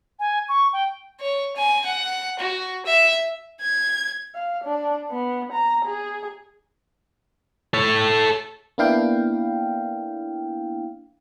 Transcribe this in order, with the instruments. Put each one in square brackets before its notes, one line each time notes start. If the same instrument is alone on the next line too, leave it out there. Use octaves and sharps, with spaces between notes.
[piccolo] G#5
C#6
G5
[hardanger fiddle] C#5
G#5
F#5
F#4
E5
[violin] G#6
[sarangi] F5
D4
B3
A#5
G#4
[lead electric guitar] A4 C#5
[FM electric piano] A#3 B3 D4 E4 F5 G5